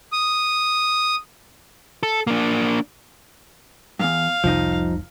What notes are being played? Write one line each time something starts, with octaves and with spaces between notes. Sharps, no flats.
D#6
A4
A#3 D4
E2 G2 F5
F1 C2 F3 D#4